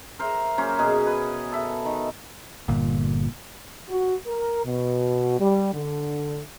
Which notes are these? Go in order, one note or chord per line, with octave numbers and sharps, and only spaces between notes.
A#4 C5 E5
F#3 A#3 C#4 C5
B2 F#4 G#4 G#5
B4
A4 E5
D#3
G1 A#2
F#4
A#4
B2
G3
D3